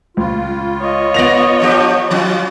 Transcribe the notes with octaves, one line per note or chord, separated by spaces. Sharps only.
C#2 F4
C#5 D#5
A#3 B3 D5 A#6 F7
G2 F3 G4
F3 F#3 C#4 F4